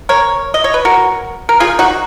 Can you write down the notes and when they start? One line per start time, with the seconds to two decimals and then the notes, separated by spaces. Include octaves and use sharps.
0.09 A#4 C#5
0.54 D#5
0.64 C#5
0.74 B4
0.85 F#4 A#4
1.49 A#4
1.60 D#3 A#3 C#4 F4 G#4
1.79 D#4 F#4